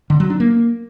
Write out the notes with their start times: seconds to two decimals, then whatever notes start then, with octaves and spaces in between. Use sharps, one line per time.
0.10 D3
0.20 F#3
0.30 D4
0.40 A#3